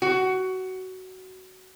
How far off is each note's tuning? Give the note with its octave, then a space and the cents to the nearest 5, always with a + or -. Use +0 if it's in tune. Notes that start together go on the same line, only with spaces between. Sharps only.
F#4 +15